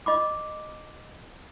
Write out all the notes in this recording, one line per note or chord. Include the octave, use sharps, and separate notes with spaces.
D#5 B5 D6